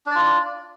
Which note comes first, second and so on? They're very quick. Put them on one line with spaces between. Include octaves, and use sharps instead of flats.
D4 D5 F4